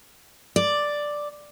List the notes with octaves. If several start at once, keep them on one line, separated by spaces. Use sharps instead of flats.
D5